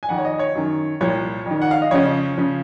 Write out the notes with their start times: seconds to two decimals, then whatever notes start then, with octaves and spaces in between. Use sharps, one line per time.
0.03 G#5
0.09 F2 D#3 F#5
0.18 C#5
0.25 D#5
0.39 C#5
0.55 F#2 D#3
1.01 C2 A#2 F3 C#5
1.46 F2
1.51 D#3
1.61 F#5
1.71 F5
1.82 D#5
1.91 F2 C#3 F3 C#5
2.38 C#3 F3